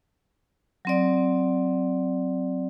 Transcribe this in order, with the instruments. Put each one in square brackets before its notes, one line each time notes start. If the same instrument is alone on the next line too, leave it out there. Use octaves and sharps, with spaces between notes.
[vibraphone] F#3 C4 D5